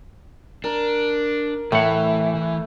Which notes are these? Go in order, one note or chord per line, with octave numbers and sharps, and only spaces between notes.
D4 A#4
A2 E3 A3 E5 F#5